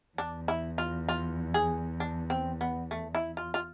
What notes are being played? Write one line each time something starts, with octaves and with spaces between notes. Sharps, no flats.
E2 D4
E4
F4
F4
G#4
D4
C4
B3
A3
E4
F4
F4